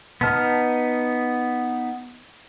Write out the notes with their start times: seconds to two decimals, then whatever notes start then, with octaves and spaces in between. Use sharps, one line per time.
0.21 B3 D#4 A5 F6